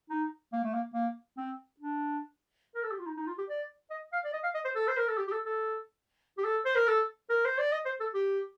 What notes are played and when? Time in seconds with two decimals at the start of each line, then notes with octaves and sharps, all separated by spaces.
0.10 D#4
0.53 A#3
0.64 A3
0.74 A#3
0.94 A#3
1.37 C4
1.80 D4
2.75 A#4
2.83 A4
2.91 G4
2.99 F4
3.06 D#4
3.17 D#4
3.27 F4
3.38 G4
3.49 D5
3.90 D#5
4.13 F5
4.25 D5
4.33 D#5
4.43 F5
4.55 D#5
4.65 C5
4.76 A4
4.88 C5
4.98 A#4
5.08 A4
5.18 G4
5.28 G4
5.32 A4
5.46 A4
6.38 G4
6.44 A4
6.65 C5
6.76 A#4
6.87 A4
7.30 A#4
7.45 C5
7.58 D5
7.73 D#5
7.85 C5
8.00 A4
8.14 G4